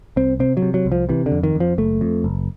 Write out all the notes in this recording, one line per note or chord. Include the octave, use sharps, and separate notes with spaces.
C2 C4
C3 C4
F#3
C3
F#3
C2
F3
C3 E3
D3
F2
D#3
F2
F3
F#1 A3
F2
F#1